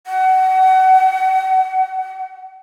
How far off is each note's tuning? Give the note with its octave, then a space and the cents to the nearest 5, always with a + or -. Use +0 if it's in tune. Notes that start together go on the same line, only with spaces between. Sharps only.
F#5 +30